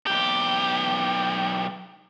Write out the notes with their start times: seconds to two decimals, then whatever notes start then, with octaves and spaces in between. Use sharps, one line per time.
0.07 B1 G4